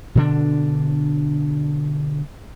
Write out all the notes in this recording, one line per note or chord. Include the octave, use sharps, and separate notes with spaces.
B2 D3 D4